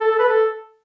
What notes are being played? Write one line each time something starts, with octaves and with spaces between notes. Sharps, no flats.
A4
A4
B4
A4